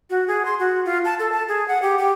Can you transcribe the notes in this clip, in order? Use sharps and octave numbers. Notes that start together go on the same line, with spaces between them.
F#4
G#4
C6
F#4
F4
A5
A4
A5
G#4
F#5
G4
G4